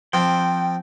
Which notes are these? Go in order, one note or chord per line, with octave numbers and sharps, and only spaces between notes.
F3 C4 G5